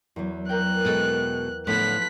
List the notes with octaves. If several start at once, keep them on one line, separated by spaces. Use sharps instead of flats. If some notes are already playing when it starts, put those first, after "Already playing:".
E2 F#3
A#4 G5 F#6
B2 G#3 A4
A2 D3 F3 A3 B3 E4 F#6 B6